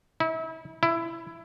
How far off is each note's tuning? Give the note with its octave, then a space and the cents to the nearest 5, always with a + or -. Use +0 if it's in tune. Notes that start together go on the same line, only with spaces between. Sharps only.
E4 -35
E4 +15